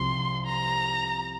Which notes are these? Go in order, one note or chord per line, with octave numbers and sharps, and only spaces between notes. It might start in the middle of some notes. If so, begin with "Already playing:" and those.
Already playing: C2 C3 F3 C6
A#5